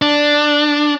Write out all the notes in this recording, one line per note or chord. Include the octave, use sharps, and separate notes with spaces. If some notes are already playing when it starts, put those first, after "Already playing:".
D4